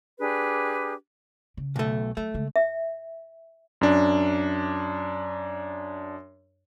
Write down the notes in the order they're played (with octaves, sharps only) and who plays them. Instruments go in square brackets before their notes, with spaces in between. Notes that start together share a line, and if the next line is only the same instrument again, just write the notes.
[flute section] D4 G4 G#4 B4
[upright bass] C#3
[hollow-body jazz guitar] B1 A3
[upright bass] F#3 [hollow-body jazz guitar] A3
[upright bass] C#3 G#3
[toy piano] E5
[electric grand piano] F#2 D4